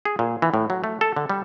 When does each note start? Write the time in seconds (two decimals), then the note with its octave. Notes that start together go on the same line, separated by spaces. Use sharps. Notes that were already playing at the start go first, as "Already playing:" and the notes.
0.05 G#4
0.19 A#2
0.42 E3
0.54 A2
0.70 F#3
0.84 A3
1.01 A4
1.16 D3
1.30 G3